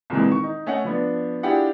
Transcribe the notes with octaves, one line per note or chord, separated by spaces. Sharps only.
C2 A#2 E3 G#3
D#3 C#6
D#4
A3 C#4 D#5 F#5
F3 B3 D4
D4 E4 F4 G4 G#4 F#5